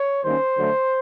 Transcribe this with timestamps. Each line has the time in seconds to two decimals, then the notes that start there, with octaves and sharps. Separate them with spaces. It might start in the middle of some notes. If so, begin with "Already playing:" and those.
Already playing: C#5
0.24 D#3 G3 A#3 C#4 C5
0.58 D3 F#3 A3